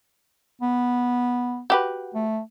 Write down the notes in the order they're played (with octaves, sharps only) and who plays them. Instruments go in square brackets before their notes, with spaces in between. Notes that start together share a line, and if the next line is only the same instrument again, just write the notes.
[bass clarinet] B3
[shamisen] F#4 G4 B4
[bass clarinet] A3